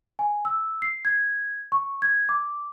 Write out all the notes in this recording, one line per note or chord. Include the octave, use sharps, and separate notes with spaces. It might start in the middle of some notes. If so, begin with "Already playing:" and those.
G#5
E6
C7
G#6
C#6
G#6
D6